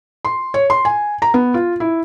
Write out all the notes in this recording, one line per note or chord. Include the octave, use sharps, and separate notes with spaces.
C6
C#5
C6
G#5
A#5
B3
F4
E4